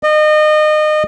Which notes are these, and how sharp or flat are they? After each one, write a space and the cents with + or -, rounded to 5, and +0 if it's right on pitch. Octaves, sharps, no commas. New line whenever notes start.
D#5 -30